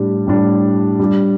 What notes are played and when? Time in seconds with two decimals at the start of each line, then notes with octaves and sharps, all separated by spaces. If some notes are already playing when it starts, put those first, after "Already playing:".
Already playing: A2 G3 D4 G4
0.27 A2 G3 D4 G4
0.99 G3 D4 G4